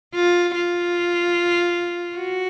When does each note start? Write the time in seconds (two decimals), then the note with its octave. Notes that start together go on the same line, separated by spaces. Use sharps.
0.15 F4
0.55 F4
2.17 F#4